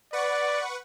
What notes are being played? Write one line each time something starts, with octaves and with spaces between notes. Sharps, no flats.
B4 D5 F#5 C#6